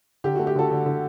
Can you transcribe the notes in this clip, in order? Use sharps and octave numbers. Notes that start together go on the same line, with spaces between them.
D3 G4
A3 F#4
G4
D3 F#4 A4
D3
D3